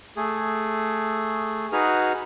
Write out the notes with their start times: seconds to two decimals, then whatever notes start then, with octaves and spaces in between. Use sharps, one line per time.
0.17 A3 G#4
1.73 D#4 F#4 G#4 B4 F6